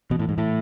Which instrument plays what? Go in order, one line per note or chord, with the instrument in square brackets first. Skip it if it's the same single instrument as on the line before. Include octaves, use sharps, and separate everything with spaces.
[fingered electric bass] B2 [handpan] E3
[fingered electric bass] A2
G#2
A2